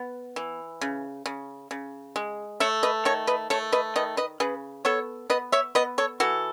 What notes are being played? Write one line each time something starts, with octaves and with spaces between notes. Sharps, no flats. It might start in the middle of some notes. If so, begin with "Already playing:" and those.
Already playing: B3
E3
C#3
C#3
C#3
G#3
A3 C#5 E5
B4 D#5
D#3 A4 C#5
B4 D#5
A3 A4 C#5
B4 D#5
D#3 B4 D#5
B4 D#5
C#3 G#4 B4
B3 A4 C#5
B3 B4 D#5
C#5 E5
B3 B4 D#5
A4 C#5
E3 F#4 A4